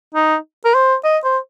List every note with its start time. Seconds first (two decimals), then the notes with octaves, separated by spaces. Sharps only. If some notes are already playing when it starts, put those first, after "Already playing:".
0.15 D#4
0.65 A#4
0.74 C5
1.04 D#5
1.24 C5